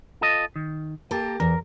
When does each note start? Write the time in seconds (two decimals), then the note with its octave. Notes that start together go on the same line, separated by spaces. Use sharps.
0.21 F4 A4 D#5
0.56 D#3
1.11 A#3 G4 A4 A#4
1.40 E2 A#4